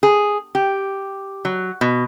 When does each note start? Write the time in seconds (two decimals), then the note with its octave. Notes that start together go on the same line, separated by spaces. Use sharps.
0.03 G#4
0.55 G4
1.45 F#3
1.81 B2